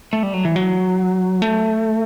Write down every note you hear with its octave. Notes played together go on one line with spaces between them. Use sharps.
A3
G3
F#3
E3
F#3
A3